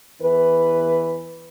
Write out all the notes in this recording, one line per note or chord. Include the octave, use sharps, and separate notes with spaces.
E2 E3 B4